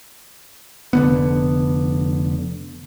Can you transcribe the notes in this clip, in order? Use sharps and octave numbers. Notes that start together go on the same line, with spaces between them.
F1 D3 B3